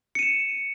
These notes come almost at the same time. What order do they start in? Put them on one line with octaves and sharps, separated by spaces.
C#7 D#7 E7